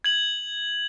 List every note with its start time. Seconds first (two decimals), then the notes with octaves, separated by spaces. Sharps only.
0.04 G#6 F#7